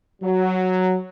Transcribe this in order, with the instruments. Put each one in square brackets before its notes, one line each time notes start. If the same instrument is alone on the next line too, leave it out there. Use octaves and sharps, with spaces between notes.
[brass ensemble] F#3